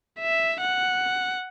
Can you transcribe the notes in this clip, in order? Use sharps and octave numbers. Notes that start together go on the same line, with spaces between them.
E5
F#5